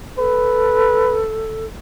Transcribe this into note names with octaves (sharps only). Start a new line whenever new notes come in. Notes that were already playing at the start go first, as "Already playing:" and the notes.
A4 B4